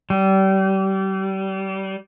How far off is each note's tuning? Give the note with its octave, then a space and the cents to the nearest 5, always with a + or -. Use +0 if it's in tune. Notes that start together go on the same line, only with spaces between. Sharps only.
G3 -30